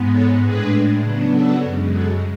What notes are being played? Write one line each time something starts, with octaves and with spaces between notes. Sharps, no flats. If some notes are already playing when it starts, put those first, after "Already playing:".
Already playing: G#2 G#3 B3
A4 C#5
A2 G#3 D4 G#4 B4
C#3 F#3 B3 D4
F#4 A4
F#2 C#3 G#3
F#4 A4